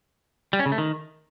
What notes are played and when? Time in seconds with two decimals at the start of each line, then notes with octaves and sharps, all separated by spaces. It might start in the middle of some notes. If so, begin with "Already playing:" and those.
0.53 G3
0.59 C#4
0.66 C#3
0.72 A3
0.78 D#3